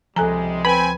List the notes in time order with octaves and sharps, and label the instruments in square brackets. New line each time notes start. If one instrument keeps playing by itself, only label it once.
[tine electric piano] C#2 F3 [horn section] C3 G3 G#3 [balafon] A4 G#5 A#5
[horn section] C4 G5 G#5 [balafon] B4 [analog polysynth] B5